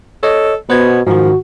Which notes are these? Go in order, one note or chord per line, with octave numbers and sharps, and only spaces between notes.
A4 C#5 D#5
B2 B3 C5 G#6
G#2 D#3 F3 F#4